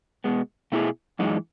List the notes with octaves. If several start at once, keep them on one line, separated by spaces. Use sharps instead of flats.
B2 G#3 B3
B2 A3 E4 G#4
F#2 E3 G#3 D#4